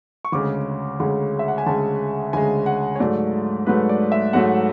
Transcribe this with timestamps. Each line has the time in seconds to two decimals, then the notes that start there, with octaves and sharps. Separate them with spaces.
0.25 C#6
0.32 D2 C#3 G#3 D6
1.00 D2 C#3 G#3
1.39 E5
1.48 F#5
1.58 G#5
1.66 D2 C#3 G#3 A5
2.33 D2 C#3 G#3 G#5
2.66 F#5
2.95 C#5
3.00 G#2 F#3 A3 D5
3.66 G#2 F#3 A3 B4
3.89 D5
4.12 E5
4.33 G#2 F#3 A3 F#5